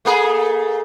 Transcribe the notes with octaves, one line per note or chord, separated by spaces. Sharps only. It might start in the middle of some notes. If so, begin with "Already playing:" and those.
A3 A#3 G#4